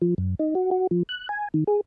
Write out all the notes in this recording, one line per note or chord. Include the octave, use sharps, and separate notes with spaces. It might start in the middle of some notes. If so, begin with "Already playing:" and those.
F3
F#2
D#4
F#4
F#4
F3
F#6
G#5
D#3
G#4